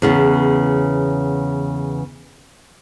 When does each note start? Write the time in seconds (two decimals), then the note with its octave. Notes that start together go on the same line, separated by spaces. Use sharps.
0.02 E2 C#3 B3